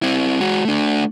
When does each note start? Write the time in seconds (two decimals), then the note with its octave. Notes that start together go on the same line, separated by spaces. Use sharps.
0.02 C4 E4
0.40 G#3 F#4
0.65 A3 D4